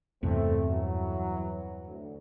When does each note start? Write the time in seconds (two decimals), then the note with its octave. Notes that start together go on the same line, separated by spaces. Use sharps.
0.23 E2 G2 C3 A3 C4
0.67 E3 F#3
1.87 D2